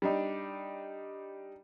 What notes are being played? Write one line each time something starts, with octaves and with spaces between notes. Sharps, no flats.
G3 D4 D#4